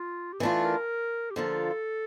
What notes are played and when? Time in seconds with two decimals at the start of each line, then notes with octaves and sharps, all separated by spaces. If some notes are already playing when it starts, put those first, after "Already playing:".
Already playing: F4
0.33 G4
0.40 E3 A3 D4 F4 A4
0.65 A#4
1.31 G4
1.36 D3 F3 A#3 F4 A4